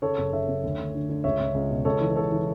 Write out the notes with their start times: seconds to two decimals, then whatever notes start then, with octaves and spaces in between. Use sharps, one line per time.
0.02 C#3 A4 C#5
0.18 F#1
0.32 C#3 C#5 E5
0.48 F#1
0.63 D2
0.79 D2
0.95 D3
1.09 D3
1.24 C#2 C#5 E5
1.40 C#2
1.54 C#2
1.70 B2
1.85 C#2 A4 C#5
2.00 E3
2.16 C#3 A4 C#5
2.32 E3